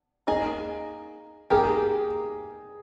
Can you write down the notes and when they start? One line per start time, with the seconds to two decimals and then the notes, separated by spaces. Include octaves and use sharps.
0.27 A#3 D#4 G#4 D#5
1.50 A#3 D#4 G4 G#4 A#4